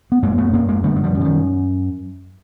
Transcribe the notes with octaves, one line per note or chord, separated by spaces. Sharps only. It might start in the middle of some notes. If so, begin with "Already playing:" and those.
B3
F#2 G#3 A#3
A3 B3
F#2 A#3 C4
G#3 A#3
D3 G3 A3
G#3
F3 G3
F#2
D3
D#3